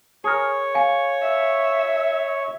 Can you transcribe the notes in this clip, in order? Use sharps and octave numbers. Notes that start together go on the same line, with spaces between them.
G#4 A#4 C#5 C#6
F5 G#5
E5